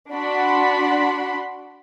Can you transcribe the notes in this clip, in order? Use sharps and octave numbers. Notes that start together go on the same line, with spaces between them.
D4 F#4 F#5 B5 C6